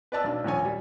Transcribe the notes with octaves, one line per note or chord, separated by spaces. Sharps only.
B4 D5 A5 E6
B1 D4
D#1 A#1 C#5 G#5
G3